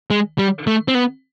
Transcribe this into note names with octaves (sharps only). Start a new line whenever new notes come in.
G#3
G3
A3
C4
B3